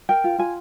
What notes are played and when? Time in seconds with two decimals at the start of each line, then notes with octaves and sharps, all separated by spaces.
0.09 A#4 G5
0.24 F4
0.38 F4 G#5